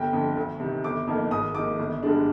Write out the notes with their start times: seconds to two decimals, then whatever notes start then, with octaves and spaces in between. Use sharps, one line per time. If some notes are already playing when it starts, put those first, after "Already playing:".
Already playing: G1 G5
0.13 F2 D3
0.37 D2
0.60 C3 D#3
0.84 G1 D6
1.07 F2 D#3 A#3 D#4
1.31 G#1 D#6
1.54 G#2 D#3 A#3 D#4 D6
1.79 G1
2.03 G2 D3 G#3 D4